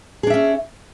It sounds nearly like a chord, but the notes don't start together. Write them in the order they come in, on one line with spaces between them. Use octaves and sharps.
G#4 D4 E5 C#4